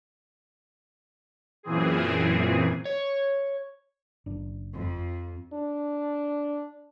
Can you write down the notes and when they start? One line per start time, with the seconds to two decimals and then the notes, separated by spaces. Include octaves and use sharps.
1.63 F#2 A#2 E3 C4 G#4
2.85 C#5
4.26 F#1 D4
4.75 F2
5.53 D4